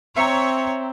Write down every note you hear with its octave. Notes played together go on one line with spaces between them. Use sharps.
C4 C#5 E5 A#5